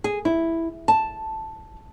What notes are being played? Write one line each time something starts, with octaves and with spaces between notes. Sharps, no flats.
G#4
E4
A5